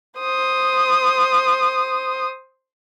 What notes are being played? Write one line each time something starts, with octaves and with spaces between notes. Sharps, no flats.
C5 D#6